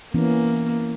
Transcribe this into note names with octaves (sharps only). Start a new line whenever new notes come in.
E3 A#3 B3 C#4